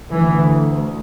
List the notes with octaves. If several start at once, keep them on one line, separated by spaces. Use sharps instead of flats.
D2 E3